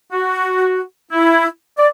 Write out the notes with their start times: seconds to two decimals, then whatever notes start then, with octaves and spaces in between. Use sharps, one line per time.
0.11 F#4
1.11 E4
1.78 D5